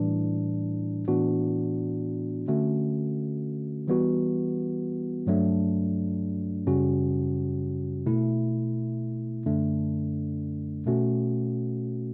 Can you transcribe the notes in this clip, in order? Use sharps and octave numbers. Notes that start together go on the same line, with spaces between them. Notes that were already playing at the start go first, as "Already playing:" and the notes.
Already playing: A2 E3 G3 D4
A2 E3 B3 D4 F#4
D3 A3 C#4 F#4
E3 G3 B3 F#4
G2 F#3 A3 D4
F#2 C#3 G3 C#4 F#4
B2 A3 E4
F#2 D3 A3 D4
B2 A3 C#4 F#4